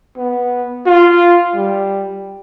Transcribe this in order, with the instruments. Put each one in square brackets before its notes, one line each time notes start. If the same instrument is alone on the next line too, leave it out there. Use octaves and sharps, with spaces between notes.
[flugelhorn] B3
F4
G3